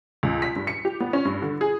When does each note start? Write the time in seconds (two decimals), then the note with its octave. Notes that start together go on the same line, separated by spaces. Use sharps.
0.23 C#2
0.42 B6
0.56 G2
0.67 C#7
0.85 G4
1.00 B3
1.13 C#4
1.25 G2
1.42 D3
1.61 G#4